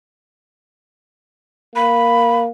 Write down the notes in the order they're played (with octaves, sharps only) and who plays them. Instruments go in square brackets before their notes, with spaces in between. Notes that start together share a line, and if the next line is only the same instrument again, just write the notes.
[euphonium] A#3 [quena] B5